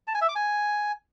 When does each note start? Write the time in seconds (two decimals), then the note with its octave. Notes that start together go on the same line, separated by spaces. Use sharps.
0.07 A5
0.15 G#5
0.22 E5
0.29 D6
0.36 G#5